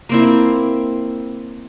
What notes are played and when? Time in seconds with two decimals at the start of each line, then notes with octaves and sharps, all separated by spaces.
0.09 A#3 C4 E4